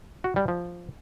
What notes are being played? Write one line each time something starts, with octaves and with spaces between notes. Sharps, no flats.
F#4
G3
F3